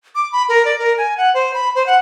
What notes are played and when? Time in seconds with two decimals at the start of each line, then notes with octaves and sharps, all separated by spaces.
0.15 D6
0.32 B5
0.49 A#4
0.65 D5
0.79 A#4
0.98 G#5
1.17 F#5
1.34 C5
1.54 B5
1.75 C5
1.86 F#5